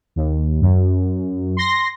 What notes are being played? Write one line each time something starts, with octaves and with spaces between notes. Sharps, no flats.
D#2
F#2
C6 A#6